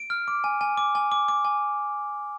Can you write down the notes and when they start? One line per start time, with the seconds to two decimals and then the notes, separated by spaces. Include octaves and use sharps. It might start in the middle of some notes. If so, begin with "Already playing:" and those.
Already playing: D7
0.10 F6
0.28 D6
0.44 G#5
0.61 G#5
0.77 D6
0.95 G#5
1.12 D6
1.28 D6
1.45 G#5